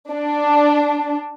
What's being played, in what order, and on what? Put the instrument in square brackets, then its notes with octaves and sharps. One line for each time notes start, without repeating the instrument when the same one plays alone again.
[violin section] D4